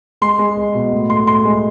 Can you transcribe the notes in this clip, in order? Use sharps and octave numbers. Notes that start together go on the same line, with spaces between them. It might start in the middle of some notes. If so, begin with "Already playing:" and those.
G#3 C6
G#3
G#3
B2
A2
A2 C6
A2 C6
G#3